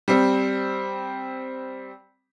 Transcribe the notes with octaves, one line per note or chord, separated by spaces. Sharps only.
G3 C4